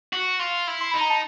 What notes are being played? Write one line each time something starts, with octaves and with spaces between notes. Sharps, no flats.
F#4
F4
E4
C6
D#4 B5
A#5
A5